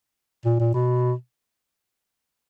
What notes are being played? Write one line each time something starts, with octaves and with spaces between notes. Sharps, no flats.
A#2
A#2
B2